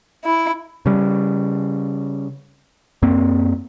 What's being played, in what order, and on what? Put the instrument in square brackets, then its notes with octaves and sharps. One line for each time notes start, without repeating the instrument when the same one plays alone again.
[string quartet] E4
[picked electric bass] C#3 G3
F#2 A#3 C4